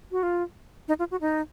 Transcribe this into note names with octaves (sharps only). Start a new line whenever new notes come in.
F#4
F4
D#4
F4
F#4
D#4